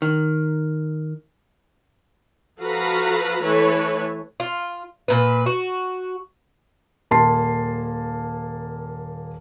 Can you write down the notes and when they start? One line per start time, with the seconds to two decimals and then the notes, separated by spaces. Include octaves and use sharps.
0.02 D#3
2.59 F3 F#4 A4 B4 F5 A#5
3.42 E3 A3 A4 B4 C#5
4.40 F4
5.08 A#2 B4
5.46 F#4
7.11 D#1 A#3 A5 C6 C7